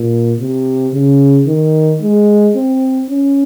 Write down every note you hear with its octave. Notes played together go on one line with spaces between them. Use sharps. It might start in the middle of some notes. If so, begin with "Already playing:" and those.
Already playing: A#2
C3
C#3
D#3
G#3
C4
C#4